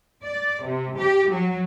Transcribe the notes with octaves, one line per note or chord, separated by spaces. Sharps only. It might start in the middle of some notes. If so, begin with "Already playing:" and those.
D5
C3
G4
F#3